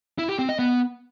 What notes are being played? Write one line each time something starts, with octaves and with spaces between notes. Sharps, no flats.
E4
G4
C4
D#5
B3